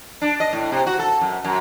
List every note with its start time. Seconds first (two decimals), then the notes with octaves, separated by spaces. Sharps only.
0.22 D4
0.40 D#5
0.53 A2
0.72 C3
0.87 F#4
0.99 A4
1.21 F#2
1.45 F#2